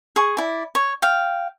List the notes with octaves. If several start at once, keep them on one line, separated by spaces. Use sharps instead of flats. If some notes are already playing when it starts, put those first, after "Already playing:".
G#4 C#6
E4 D5
C#5
F5 G5